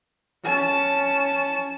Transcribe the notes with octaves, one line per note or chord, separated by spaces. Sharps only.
C#4 A5